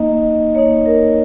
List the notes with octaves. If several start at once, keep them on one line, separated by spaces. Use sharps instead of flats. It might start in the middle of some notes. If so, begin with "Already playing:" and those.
Already playing: A#3 D#4 D#5
A#3 D#4 C#5
A#4